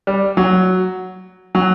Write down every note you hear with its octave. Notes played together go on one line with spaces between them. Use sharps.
G3
F#3
F#3